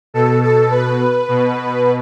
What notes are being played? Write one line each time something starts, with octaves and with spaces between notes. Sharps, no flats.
B2 A4
A4
B4
B2